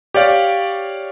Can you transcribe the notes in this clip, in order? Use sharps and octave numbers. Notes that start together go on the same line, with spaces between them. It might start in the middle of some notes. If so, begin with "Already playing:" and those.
G4 C#5 D5 F5